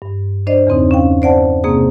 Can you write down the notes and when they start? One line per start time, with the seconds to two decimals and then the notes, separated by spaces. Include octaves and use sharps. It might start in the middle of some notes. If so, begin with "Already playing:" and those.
0.02 G2
0.47 D4 C5 D5 D#5
0.67 E2 C#3 C4 D#4
0.91 C#4 F5 G5
1.22 C5 D5 F#5 A5
1.64 C3 A#3 C4 G#4 D#6